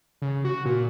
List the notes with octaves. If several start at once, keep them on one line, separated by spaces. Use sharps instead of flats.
C#3
F#4
A#2